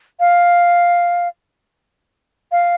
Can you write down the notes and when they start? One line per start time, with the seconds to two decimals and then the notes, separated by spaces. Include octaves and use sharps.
0.20 F5
2.52 F5